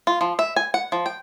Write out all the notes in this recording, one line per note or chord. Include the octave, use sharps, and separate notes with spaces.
F4
F3
E5
G#5
F#5
F3
G5